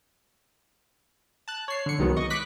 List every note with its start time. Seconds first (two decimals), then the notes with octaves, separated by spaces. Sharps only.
1.48 A5 F#6
1.68 C#5 C7
1.86 D3 C#7
1.99 C2 D#3 F#3 G#3 B3
2.16 D#5 C#6
2.30 B5 D6 F#6 B6